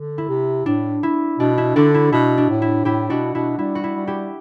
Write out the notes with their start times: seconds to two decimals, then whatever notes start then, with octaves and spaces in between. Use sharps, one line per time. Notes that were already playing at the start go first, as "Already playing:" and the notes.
Already playing: D3
0.18 E4
0.29 C3
0.66 A2 D4
1.03 E4
1.39 B2 D4
1.58 E4
1.76 D3 D4 F#4
1.94 E4
2.12 B2 E4
2.38 D4
2.50 A2
2.62 E4
2.85 A2 E4 G4
3.10 B2 D4 F#4
3.35 B2 E4
3.59 G3 E4
3.75 F#4
3.84 E4
3.96 G3
4.07 E4 G4